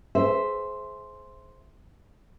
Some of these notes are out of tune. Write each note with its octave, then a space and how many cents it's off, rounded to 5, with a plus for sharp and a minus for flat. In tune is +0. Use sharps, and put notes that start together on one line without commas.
G#4 +30 C5 +0 E5 +0